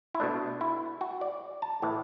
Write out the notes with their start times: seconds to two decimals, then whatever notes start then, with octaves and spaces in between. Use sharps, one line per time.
0.15 E4
0.20 B2 A3 D4
0.61 E4
1.01 F#4
1.21 D5
1.62 A5
1.82 A2 E3 A3